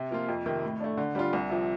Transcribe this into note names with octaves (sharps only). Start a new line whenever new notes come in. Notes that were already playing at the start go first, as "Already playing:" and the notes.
Already playing: C3
F3 A#3 F4
F2
C3 D#3
A2
A3 D4
D3
G3 D4 F4
C2
C3 F3